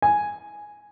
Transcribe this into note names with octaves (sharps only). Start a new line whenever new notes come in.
G#5